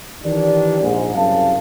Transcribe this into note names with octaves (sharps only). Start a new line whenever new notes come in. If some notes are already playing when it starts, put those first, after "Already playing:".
D#3 E3 D4 G4
A#1 G#2
C2 F#2 C#3 F5 A5